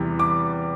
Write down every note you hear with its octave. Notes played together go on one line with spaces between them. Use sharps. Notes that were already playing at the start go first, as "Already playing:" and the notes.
Already playing: E2 C3 E3 G3
D6